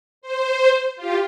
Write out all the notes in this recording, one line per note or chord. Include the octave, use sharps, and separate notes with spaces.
C5
F4 G4